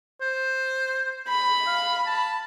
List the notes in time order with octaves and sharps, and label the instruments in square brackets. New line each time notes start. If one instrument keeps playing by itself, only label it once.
[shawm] C5
[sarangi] B5
[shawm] F5
A5